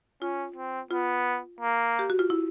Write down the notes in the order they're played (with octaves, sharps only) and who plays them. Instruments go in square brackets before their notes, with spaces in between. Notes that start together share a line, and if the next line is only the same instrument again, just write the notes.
[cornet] C#4 [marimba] F4
[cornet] C4
[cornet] B3 [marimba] F4
[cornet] A#3
[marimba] G4
F#4
F4
E4